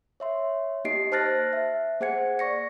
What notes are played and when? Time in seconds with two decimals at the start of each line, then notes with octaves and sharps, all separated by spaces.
0.20 C#5 E5 C6
0.84 A#3 D#4 G4 D#5 C7 D7
1.12 C5 A5 F6 F#6 A6 A#6
1.53 E5
2.00 A#3 G#4 C5 F#5 G#6 C#7
2.39 D5 C#6 A#6 C#7